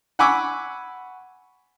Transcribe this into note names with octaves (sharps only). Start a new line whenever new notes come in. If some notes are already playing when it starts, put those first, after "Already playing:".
F#5 G#5 B5 C#6 D6 E6